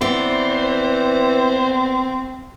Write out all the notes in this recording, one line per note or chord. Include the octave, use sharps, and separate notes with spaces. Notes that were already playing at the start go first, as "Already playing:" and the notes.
E3 B3 C4 C5 D5